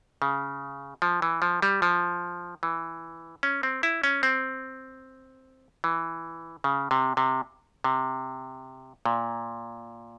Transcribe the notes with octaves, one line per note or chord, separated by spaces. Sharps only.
C#3
F3
E3
F3
G3
F3
E3
C#4
C4
E4
C#4
C4
E3
C#3
C3
C3
C3
A#2